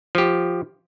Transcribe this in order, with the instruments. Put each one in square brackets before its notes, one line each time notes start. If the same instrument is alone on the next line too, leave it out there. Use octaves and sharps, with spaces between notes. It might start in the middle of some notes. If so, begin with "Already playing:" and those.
[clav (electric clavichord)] F3 G4